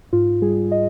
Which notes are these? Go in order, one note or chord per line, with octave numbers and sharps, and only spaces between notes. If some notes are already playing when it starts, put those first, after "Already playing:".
G#2 F4
G3 G#4
D#5